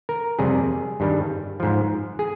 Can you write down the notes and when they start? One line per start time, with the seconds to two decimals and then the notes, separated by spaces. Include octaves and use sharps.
0.09 A#4
0.39 F2 C3 G3 G#4
1.00 G2 D#3 G3
1.60 G#2 F3
2.19 G#4